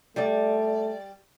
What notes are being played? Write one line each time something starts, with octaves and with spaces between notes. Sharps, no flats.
G3 A3 D5